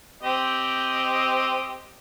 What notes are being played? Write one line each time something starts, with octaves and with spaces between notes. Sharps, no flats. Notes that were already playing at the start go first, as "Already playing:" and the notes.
C4 G4 D#5